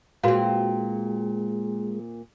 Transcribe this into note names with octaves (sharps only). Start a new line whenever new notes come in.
A#2 G#3 C4 F#4 B4 F5